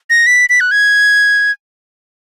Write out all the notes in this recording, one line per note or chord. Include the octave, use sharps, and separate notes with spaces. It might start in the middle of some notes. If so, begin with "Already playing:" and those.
A#6
B6
B6
F#6
G#6